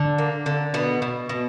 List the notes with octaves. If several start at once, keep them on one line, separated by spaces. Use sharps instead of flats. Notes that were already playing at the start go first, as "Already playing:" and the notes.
Already playing: D3
A#3
D3
B2 B3
B2
B2